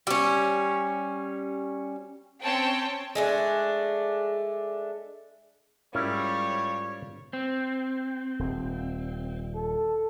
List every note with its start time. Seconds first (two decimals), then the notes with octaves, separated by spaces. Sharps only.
0.07 G3 C#4
2.43 C4 C#4 C#5 G5 A5
3.15 G#3 A3 D4
5.95 G#2 G3 C#4 E4 F4 A#4 C#5
7.33 C4
8.39 D#1
9.55 A4